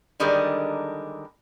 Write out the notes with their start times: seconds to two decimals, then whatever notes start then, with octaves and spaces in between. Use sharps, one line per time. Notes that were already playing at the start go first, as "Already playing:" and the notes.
0.20 D3 D#3 G3 G#3 D4 A#4